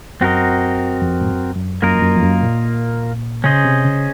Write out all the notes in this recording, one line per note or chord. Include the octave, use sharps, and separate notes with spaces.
F#2 C4 F#4 A#4 D#5
F2
G#2
F#2
F#2
F#2 A#3 F4 A#4 D#5
F2
F#2
F2
F#2
A#2
C#3 C#4 G#4 C5 D#5
C3
C#3